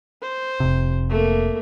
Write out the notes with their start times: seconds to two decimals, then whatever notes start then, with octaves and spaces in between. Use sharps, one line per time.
0.22 C5
0.60 F1 C3
1.09 A3 A#3